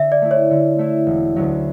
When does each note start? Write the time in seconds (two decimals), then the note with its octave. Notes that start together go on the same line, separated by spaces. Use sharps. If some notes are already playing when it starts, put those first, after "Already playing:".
Already playing: D3 E5
0.12 D5
0.22 A3 E4
0.31 C#5
0.51 D3
0.79 A3 E4
1.07 E1
1.36 D2 D3 F#3 C#4